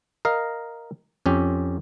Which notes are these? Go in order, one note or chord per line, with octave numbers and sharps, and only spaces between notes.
A#4 D#5 F5
F2 C#4 G4